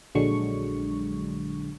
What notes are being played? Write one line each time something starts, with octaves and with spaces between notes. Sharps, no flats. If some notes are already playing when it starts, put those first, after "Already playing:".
A#1 D3 F#3 G#3 D4 C#6